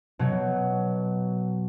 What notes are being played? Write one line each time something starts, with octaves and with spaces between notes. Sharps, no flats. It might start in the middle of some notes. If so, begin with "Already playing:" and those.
B2 F#3